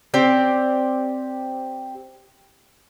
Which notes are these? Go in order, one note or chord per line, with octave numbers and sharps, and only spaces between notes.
C4 G4 D5